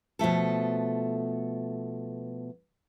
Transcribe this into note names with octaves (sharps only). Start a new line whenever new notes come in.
B2 F3 A3 A4